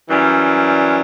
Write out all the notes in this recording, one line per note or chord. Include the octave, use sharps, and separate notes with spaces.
F#2 E3 G3